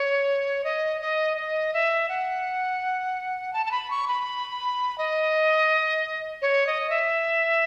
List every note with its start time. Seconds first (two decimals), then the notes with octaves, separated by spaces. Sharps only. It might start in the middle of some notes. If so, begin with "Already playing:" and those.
Already playing: C#5
0.64 D#5
1.01 D#5
1.37 D#5
1.74 E5
2.09 F#5
3.53 A5
3.66 A5
3.71 B5
3.90 C#6
4.08 B5
4.98 D#5
6.42 C#5
6.67 D#5
6.90 E5